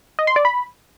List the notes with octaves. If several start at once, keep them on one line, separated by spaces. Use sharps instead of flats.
D#5
C6
D5
B5